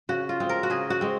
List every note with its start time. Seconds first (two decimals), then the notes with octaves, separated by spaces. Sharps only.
0.09 C#3 F#4
0.29 F4
0.40 G#3 C4
0.49 A#4
0.63 F#4
0.70 C#3 G#4
0.90 F#4
1.01 G#3 C4